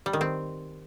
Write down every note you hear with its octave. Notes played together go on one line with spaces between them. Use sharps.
G3
D#3
C4